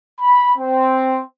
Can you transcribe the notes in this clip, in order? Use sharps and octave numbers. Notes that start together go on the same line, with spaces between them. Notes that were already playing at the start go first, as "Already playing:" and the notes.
B5
C4